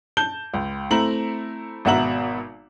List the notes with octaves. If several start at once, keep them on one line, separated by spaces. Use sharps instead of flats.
A5 G6 G7
C#2
A3 C4 E4 A#5 F#7
G#1 B2 E5 F#5 A#5 F#7